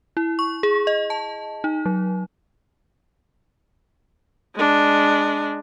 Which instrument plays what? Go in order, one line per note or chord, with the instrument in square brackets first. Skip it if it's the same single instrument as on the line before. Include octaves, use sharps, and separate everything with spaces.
[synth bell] E4
C#6
G#4
D#5
A5
D#4
F#3
[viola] G#3 D4